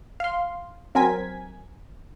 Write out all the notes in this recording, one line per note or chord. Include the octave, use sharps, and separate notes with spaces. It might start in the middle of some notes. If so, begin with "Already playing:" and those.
F5 C6
F#3 C4 A#4 G#5 G#6 B6